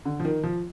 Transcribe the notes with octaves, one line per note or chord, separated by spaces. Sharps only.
D3
F3
D#3
F3